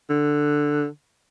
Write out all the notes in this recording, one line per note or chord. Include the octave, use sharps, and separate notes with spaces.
D3